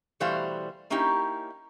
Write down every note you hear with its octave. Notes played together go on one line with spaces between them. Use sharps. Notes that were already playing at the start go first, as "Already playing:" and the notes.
B2 E3 G3 A3 C5 F5
A#3 C#4 D#4 E4 G4